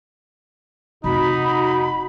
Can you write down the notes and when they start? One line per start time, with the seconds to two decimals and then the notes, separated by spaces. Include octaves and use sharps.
1.04 F1 D#4 F#4 B5